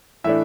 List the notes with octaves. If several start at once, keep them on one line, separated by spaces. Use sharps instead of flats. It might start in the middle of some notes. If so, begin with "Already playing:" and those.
A2 E3 A3 D4 E5